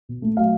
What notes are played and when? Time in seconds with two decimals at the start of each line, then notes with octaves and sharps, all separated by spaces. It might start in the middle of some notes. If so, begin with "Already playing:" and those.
0.09 B2
0.22 A3
0.37 F#3 F5